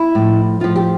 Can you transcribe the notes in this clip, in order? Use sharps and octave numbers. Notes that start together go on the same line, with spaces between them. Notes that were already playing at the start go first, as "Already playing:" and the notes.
Already playing: E4
A2 F3
A2 F3 F4
G4